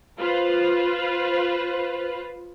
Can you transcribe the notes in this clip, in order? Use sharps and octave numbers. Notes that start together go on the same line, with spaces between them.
F4 B4 C5